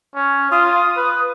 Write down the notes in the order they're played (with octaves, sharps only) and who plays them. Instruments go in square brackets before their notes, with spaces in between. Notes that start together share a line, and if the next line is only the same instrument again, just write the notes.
[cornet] C#4
[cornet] F4 [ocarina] D#6
[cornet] B4